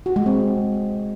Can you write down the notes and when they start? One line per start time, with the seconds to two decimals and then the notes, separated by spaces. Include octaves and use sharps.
0.06 F#4
0.16 G#3
0.26 C4